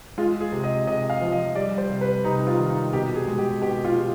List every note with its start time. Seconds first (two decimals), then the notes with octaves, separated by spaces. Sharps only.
0.18 G#3 F4
0.41 G#4
0.52 C3
0.64 D#5
0.87 C3 D#5
1.10 F5
1.21 F3
1.32 D#5
1.55 G3 D5
1.78 C5
1.89 C3
2.01 B4
2.24 C3 D#4
2.47 F4
2.59 D#3
2.70 D#4
2.93 B2 G4
3.15 G#4
3.28 G#3
3.38 G4
3.62 B2 G4
3.85 F4
3.97 G#3